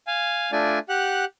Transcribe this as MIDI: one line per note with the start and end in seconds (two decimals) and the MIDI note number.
0.07 0.52 77
0.07 0.52 80
0.52 0.79 57
0.52 0.79 62
0.52 0.79 65
0.52 0.79 74
0.52 0.79 80
0.89 1.25 67
0.89 1.25 78
0.89 1.25 90